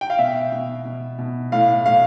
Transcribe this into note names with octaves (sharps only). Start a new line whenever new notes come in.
G5
F5
B2 E5
B2
B2
B2
A2 F5
A2 F5